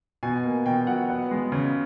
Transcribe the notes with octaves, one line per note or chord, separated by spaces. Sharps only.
B2 G#5
A#3
B2 G5
F#3 F#5
B3
G#3
C#3